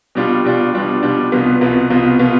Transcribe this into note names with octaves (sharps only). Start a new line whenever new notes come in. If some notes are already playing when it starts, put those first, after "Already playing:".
B2 G3 D4 F4
B2 G3 D4 F4
B2 G3 D4 F4
B2 G3 D4 F4
C2 B2 B3 F4
C2 B2 B3 F4
C2 B2 B3 F4
B2 B3 F4